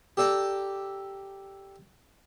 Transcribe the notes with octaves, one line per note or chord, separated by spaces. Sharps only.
G4 A4 D5 G5 A#5